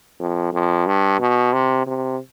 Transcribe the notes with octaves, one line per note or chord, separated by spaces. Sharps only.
F2
F2
G2
B2
C3
C3